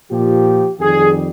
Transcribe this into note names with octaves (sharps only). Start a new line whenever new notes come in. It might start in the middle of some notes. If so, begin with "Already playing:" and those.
A#2 F3 G4
F2 D#3 G3 G#4